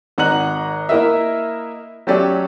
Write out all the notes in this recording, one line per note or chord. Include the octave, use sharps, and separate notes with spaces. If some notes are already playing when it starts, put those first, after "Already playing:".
G#1 D#4 F#5 A#5 F#6 F#7
A#3 E4 A#4 D#5 E5
F#3 A3 C#4 G4 A4 D5